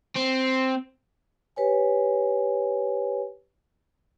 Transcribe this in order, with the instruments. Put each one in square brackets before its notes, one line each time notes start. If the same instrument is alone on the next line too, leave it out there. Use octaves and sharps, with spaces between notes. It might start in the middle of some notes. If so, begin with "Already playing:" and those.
[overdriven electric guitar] C4
[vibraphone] G4 B4 C#5 G#5